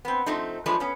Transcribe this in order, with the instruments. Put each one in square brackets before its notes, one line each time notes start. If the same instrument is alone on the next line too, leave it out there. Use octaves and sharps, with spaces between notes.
[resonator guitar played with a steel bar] B3 C4
F3 A3 C4 D#4
F3 G#3 A3 D4 B4
B3 C#4